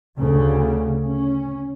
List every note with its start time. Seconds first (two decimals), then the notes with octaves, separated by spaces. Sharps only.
0.17 D2 C#3
1.05 C#4